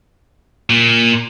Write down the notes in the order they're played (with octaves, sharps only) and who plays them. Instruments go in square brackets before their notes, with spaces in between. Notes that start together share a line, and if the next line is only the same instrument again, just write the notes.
[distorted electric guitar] A#2